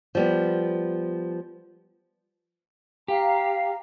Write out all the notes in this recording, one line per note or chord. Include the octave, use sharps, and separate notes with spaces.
F3 G3 B3
G4 F5 A#5